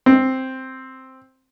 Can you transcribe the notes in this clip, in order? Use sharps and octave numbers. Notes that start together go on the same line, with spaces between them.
C4